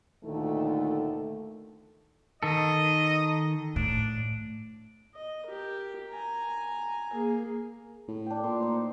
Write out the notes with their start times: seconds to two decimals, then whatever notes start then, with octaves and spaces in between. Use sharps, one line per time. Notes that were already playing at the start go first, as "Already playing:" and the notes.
0.25 D2 A#2 D#3 A3 A4
2.43 D#3 A4 D#5
3.76 A2 D4
5.14 D#5
5.46 G4 A#4
6.10 G#5 A#5
7.13 A#3 G#4
8.08 A2
8.26 D4 G5
8.43 A#2 C6 D6
8.61 D#4 C5